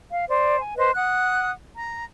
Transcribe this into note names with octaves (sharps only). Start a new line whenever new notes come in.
F5
C5 D5
G#5
B4 C5 D#5
F#5 D#6 F#6
A#5